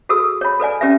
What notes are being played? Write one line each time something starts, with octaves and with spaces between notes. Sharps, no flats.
F#4 G#4 A4 B4 D#6 E6
C#5 B5
A4 B4 D5 G#5
C#4 G4 B4 D5 E5